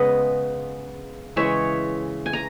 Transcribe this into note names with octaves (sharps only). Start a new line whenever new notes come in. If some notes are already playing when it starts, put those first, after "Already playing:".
Already playing: C#3 G#3 B3 B4 D#5
C#3 E3 G#3 C#5 E5
G#5
A#5